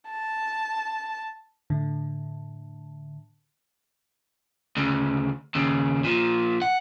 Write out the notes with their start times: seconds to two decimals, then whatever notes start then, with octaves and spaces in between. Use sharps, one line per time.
0.10 A5
1.70 A2 D3
4.77 D2 C#3
5.55 D#2 C#3
6.04 A#2 F3
6.62 F#5